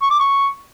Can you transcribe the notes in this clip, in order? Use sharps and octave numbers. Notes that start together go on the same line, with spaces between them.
C#6
D6
C#6